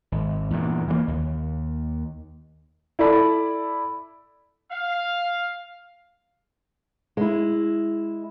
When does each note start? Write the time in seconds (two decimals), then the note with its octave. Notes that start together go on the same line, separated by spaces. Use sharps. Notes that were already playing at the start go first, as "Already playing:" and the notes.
0.12 G#1
0.50 E2 G2 A#2
0.88 E3 F#3 A#3
1.08 D#2
2.99 E4 A4 D5 B5
4.71 F5
7.17 G#3 E4